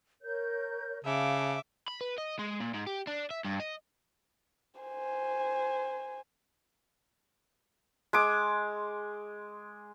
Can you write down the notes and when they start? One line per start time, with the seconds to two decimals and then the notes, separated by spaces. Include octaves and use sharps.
0.22 A#4 C#5 G6
1.04 C#3 E5 F5 A5 D6
1.88 B5
2.01 B4
2.18 D#5
2.39 G#3
2.60 A#2
2.74 G#2
2.87 G4
3.07 D4
3.30 E5
3.45 G2
3.60 D#5
4.80 C5 G#5
8.13 G#3 D6